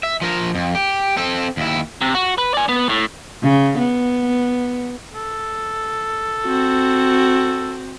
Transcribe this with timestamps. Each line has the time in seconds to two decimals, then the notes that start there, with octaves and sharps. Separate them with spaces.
0.03 E5
0.22 F3 A#4
0.55 F2
0.75 G4
1.17 C4 A4
1.57 D#2 E4
2.01 C3
2.15 F#4
2.38 B4
2.54 D5 G#5
2.69 B3
2.89 A2
3.42 C#3
3.78 B3
5.15 A4
6.44 C4 F#4